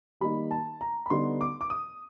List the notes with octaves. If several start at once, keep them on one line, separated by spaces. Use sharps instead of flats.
D#3 G3 A#3 D#4 B5
A5
A#5
B5
D3 G3 B3 D#4 C6
D6
D6
D#6